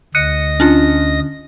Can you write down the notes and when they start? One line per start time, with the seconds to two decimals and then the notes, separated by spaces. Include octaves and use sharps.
0.15 D2 D#5 F#6 A#6 C#7 D#7
0.60 C#4 D4 F4